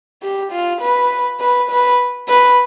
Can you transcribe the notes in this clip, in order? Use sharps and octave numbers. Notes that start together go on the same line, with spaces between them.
G4
F4
B4
B4
B4
B4